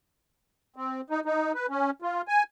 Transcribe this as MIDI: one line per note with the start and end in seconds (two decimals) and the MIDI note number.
0.76 1.01 60
1.10 1.20 63
1.25 1.52 63
1.55 1.66 71
1.70 1.91 61
2.02 2.22 65
2.28 2.43 80